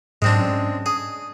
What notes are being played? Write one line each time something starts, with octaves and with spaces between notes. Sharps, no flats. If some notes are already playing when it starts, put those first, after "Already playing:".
G#2 F#3 G#3 C4 D4
C#4
G#4